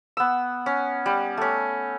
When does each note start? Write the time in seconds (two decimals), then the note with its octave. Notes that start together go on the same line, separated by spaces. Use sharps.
0.17 B3 E6
0.66 C#4
1.06 G3
1.37 A3 C#4